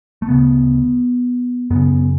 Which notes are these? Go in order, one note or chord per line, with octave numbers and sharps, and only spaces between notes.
A3
D2 C#3 B3
F#2 C#3 B3